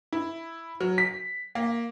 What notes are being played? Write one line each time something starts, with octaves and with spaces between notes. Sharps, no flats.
E4
F#3
B6
A#3